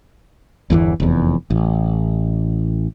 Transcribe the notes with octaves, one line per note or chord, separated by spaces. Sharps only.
G1 E2 C#3 E3
F1 E2
A1